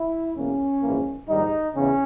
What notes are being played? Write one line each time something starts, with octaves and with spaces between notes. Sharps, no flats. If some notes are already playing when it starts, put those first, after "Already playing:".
Already playing: E4
E2 B2 A#3 C#4
A#1 G#2 E3 A#3
A#1 G#2 D#3 G3 D#4
E2 C#3 C#4